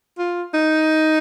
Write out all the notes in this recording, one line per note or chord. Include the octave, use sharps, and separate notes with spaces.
F4
D#4